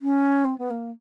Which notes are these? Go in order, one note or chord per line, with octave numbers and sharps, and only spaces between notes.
C#4
C4
B3
A#3